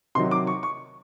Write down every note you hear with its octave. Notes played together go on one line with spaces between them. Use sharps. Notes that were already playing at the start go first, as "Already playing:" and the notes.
C3 D#3 F#3 C6
D6
C#6
C#6